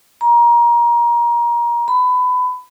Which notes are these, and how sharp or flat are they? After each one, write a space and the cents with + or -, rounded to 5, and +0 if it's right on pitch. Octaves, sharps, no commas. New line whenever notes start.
A#5 +25
B5 +20